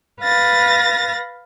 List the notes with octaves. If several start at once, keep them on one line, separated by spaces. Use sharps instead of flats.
B4 F5 A6 A#6